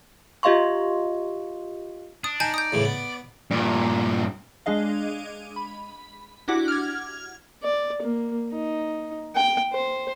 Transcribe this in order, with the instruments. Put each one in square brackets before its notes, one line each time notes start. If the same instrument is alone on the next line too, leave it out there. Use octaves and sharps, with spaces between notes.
[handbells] F4 G4 D#5 F5 C6 C#6
[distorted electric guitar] D4 [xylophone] D#6
[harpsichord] D#4 [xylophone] G#5 A5 G6
[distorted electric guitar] D5 [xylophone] D#6 G6
[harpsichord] A2 C#3 E3
B3
[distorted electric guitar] G2 A#2
[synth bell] G#3 D4 G#4 D#5 F5
B5
D4 E4 F#4 G4 F#5 D6
F6 G#6
[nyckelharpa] D5
A#3
D#4
G5
C5